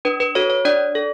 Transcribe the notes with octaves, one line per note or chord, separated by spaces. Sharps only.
D4 B4
B4
F#4 A4 C#5
C#5
D4 D5
A4